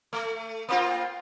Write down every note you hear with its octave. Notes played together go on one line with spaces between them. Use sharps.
A3
A#3 C4 F4